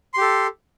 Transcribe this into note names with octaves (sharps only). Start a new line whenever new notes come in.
G4 A4 C6